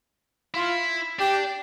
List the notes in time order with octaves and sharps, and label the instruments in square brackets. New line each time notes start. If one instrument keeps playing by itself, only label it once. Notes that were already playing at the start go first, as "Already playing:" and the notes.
[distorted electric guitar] E4 [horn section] F4
[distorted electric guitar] D4 [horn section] G4